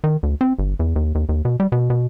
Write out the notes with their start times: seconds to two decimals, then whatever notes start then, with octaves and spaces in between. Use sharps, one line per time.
0.04 D#3
0.23 D2
0.41 C4
0.59 G1
0.79 E2
0.96 D#2
1.15 D#2
1.29 D#2
1.45 B2
1.60 G3
1.72 B2
1.90 B2